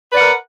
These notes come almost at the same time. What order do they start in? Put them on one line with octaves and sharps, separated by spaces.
B4 D5 F#5 A#4